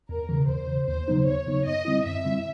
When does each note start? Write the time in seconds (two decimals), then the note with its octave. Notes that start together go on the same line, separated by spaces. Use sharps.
0.09 E2 A#4
0.29 C#3 E3
0.48 E2 C5
0.67 C#3 E3
0.87 D#2 C5
1.08 C#3 F#3 B3 D#4
1.26 D#2 C#5
1.46 C#3 F#3 B3 D#4
1.66 F#2 D#5
1.85 D3 G3 C4 E4
2.05 F#2 E5
2.25 D3 G3 C4 E4